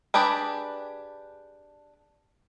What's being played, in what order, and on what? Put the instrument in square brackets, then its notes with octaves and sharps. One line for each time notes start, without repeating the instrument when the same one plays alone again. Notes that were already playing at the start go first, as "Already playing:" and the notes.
[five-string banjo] D4 G4 G#4 B4